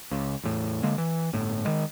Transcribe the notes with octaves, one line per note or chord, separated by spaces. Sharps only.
C#2 C#3
E2 A2
D3 G#3 A#3
E3
G1 A2
D#3 G#3